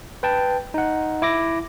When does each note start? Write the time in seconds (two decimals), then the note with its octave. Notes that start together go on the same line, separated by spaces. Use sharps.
0.23 B4 G5 A5
0.74 D#4 F#5
1.22 E4 D6 A#6